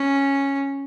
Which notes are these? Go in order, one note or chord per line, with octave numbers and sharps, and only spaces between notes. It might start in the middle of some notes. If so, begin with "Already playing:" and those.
Already playing: C#4